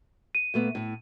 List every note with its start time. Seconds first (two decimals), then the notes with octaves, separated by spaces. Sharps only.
0.35 D#7
0.54 A#2 A3 B3
0.75 A2 A3